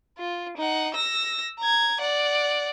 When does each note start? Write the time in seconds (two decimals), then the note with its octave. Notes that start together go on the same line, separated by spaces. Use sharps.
0.18 F4
0.57 D#4 F#5
0.94 E6 A#6
1.60 A#5 G#6
2.00 D5 F#5